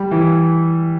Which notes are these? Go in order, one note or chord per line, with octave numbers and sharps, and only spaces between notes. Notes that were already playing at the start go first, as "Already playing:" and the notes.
Already playing: G3
E3